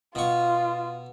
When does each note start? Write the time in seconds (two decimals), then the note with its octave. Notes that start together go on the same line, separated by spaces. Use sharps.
0.15 B2 F4 C#6